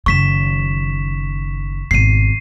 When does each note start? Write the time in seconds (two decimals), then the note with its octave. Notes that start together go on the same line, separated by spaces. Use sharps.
0.06 F#1 D#3 C#6 B6 E7
1.91 G#1 B2 C7 D#7